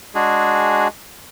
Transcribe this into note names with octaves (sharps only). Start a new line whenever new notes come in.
G#3 D4 F#4 G#4